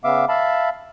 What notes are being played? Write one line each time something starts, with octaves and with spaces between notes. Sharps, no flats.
C#3 B3 E5 F5 D6
E5 F5 A5 B5